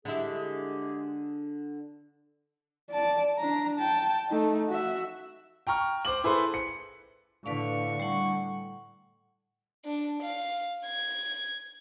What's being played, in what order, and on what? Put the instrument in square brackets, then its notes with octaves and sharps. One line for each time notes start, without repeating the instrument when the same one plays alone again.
[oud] D3 E4 [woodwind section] G#3 G4 G#4
[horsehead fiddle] D5 A5
D4 A#5
G5 A5
A3 D#4
F#4 E5
[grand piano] G5 A#5 C#6 F6
C5 D6 F#7
E4 G#4 A4 B4 C5 C6
C#7
[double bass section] A2 D3 [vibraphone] B4 D5 F5 [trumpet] C#6
[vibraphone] G3 F#5
[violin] D4
F5
G#6